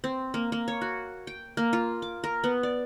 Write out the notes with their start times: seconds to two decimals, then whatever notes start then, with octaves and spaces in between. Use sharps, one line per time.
0.04 C4
0.34 A#3
0.52 A#3
0.68 C#5
0.81 F#4
1.27 G5
1.57 A#3
1.73 F4
2.02 D6
2.24 A#4
2.44 B3
2.63 D5